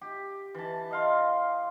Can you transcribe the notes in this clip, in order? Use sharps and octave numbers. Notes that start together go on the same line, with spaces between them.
G4
E3 A5
D#5 F5 C6